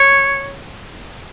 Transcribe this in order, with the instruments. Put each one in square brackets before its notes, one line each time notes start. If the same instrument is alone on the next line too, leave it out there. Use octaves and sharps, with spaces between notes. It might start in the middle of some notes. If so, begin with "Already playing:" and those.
Already playing: [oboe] C#5